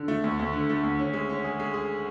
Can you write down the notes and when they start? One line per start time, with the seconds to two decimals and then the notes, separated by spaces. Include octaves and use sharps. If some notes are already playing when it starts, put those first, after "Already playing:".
Already playing: D3
0.08 A3
0.24 D2
0.39 D2
0.53 D3
0.69 A3
0.84 D2
0.99 C#4
1.13 G#3
1.29 C#4
1.44 G#4
1.60 G#3
1.74 G#4